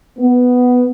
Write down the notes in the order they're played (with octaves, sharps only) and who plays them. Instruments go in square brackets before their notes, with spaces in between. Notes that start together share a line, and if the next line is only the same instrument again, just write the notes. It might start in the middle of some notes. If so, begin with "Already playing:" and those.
[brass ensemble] B3